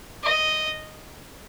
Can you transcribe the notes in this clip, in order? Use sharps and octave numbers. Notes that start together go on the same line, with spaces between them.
D#5